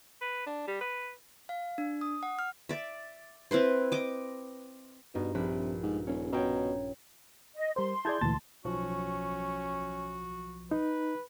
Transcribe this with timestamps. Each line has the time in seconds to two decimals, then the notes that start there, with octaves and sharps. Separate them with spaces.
0.21 B4
0.46 D4
0.67 G3
0.81 B4
1.49 F5
1.78 D4
2.01 D#6
2.23 F#5
2.39 F6
2.69 D5 E5
3.51 C4 E4 B4 C5
3.92 D#5 D6
5.15 G2 B2 D#4
5.35 A#1 C3 B4
5.83 G#2
6.07 D#1 C#4
6.33 B2 C#5 G5 A#5
7.56 D#5
7.76 G3 A#4 C5 C6
8.05 E4 G#4 D5 A5 G6 G#6
8.21 D2 A#2 E3 A5 A6
8.65 B1 F3 C#4 F#4
10.71 D#4 B4